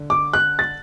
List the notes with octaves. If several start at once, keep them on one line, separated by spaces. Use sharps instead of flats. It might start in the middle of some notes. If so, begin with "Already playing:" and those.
Already playing: D3
D6
F#6
A6